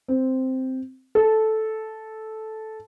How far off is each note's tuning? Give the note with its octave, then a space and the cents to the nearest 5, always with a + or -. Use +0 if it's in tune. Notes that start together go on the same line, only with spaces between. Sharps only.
C4 -5
A4 -10